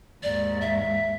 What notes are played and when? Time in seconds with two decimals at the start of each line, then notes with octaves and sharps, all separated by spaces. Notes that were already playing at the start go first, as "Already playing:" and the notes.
0.23 D#2 G#2 D5
0.61 E5